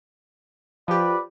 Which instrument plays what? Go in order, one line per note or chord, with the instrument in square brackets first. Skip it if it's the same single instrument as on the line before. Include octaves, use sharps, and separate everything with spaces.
[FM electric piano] F3 G4 [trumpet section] B4 D5